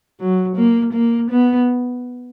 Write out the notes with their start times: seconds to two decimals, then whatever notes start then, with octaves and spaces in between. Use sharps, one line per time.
0.20 F#3
0.57 A#3
0.94 A#3
1.31 B3